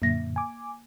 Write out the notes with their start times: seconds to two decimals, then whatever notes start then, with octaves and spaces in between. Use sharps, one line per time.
0.02 F#2 A#2 D3 A#3 E5 A#6
0.36 G#5 D6